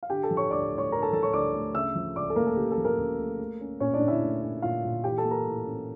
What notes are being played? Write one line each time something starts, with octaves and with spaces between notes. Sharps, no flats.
F5
D3 G4 G5
A4 A5
F3
C#5 C#6
D2 D5 D6
A3
C#5 C#6
D3 A#4 A#5
A4 A5
F3 A4 A5
C#5 C#6
D2 D5 D6
A3
C#3 E5 E6
F3
C#2 D5 D6
A4
A3 A#3 A#4
A4
C#3 G4
A4
F3
A#3 A#4
C#2
A3
A3
C#4
A#2 C#4 C#5
D4 D5
A#2
E4 E5
A3
C#4
A#2 F4 F5
A#2
E3 G4 G5
A4 A5
A#3
A#4 A#5
A2
C#4